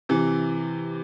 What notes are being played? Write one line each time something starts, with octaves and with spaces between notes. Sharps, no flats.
C3 E3